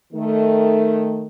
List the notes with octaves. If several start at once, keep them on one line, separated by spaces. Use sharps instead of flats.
D#3 A3